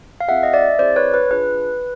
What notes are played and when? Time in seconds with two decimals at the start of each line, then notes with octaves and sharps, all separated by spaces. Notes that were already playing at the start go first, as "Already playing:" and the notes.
0.21 F5
0.28 C4 F4 G#4 E5 F#5
0.43 D#5
0.53 D5 E5
0.79 C4 E4 G#4 C5 D5
0.96 B4 C#5
1.14 B4
1.31 D4 F4 G#4 B4